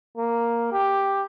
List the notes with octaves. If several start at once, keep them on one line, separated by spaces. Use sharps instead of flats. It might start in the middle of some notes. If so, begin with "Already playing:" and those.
A#3
G4